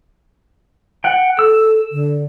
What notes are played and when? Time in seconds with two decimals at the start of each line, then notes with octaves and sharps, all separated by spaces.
1.04 F#5 G5
1.39 A4 E6
1.92 D3